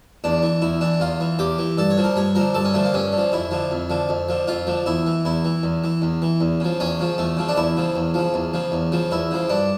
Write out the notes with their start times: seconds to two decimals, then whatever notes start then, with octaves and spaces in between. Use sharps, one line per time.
0.24 E2 D4
0.43 E3
0.61 E2 E4
0.81 E3 D4
1.00 E2 F4
1.20 E3
1.39 E2 G4
1.59 E3
1.78 G2 A4
1.90 C#5
1.98 D3 F3
2.04 A#4
2.16 G2 C#5
2.35 D3 F3 A#4
2.54 G2 A4
2.65 C#4
2.74 D3 F3 A3
2.85 A#3
2.94 G2 C#4
3.12 D3
3.18 F3
3.32 F2 E4
3.51 D3 F3
3.71 F2
3.90 D3 F3
4.09 F2
4.29 D3 F3
4.48 F2 F4
4.67 D3 F3
4.86 E2 E4
5.07 E3
5.25 E2 E4
5.45 E3
5.63 E2
5.84 E3
6.02 E2
6.22 E3
6.41 E2
6.60 C#3 F3
6.80 E2 C#4
6.99 C#3 F3
7.18 E2 A3
7.37 C#3 F3
7.48 D4
7.57 E2 E4
7.77 C#3 F3
7.96 E2
8.14 C#3 F3
8.34 E2
8.54 C#3 F3
8.72 E2
8.92 C#3 F3
9.11 E2 E4
9.31 C#3 F3
9.50 G2 D4